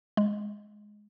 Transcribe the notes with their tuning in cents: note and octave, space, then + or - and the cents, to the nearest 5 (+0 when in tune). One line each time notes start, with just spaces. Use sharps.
G#3 +0